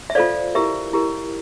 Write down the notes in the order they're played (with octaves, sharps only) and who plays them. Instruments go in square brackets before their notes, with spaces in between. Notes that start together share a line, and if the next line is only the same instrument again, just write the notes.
[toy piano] E5
F4 A4 C5 D5 F5
E4 G4 A#4 E5
E4 G4 A#4